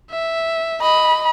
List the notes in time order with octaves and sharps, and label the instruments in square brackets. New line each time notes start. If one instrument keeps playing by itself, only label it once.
[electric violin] E5
[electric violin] D#5 [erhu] B5